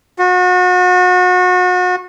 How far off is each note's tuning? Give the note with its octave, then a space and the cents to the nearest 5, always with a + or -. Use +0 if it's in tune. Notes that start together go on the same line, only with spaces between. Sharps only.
F#4 -35